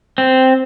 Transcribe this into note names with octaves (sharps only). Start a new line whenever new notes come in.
C4